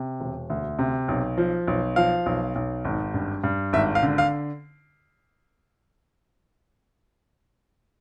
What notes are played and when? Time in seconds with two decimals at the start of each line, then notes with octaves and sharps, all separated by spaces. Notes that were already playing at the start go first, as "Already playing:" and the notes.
Already playing: C3
0.21 E1
0.50 D2
0.79 C3
1.08 B1
1.38 F3
1.67 B1
1.96 F3 F5
2.26 B1
2.55 B1
2.85 G#1
3.14 G2
3.43 G2
3.73 G#1 E5
3.95 F5
4.03 D3
4.18 F5